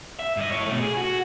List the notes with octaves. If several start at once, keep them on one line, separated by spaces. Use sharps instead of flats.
E5
G2 D#5
E4 C#5
B2 A3
G#4
F#4